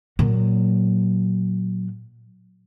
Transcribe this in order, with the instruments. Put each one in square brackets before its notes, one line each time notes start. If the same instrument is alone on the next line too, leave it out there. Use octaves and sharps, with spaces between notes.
[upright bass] A#2 F#3